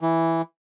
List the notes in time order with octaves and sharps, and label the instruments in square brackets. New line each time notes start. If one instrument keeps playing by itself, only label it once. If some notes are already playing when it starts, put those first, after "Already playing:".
[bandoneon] E3